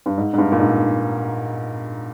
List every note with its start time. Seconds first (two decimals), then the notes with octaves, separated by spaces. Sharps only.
0.06 G2
0.18 G#2
0.34 G#2
0.38 G2
0.52 A#2
0.59 G#2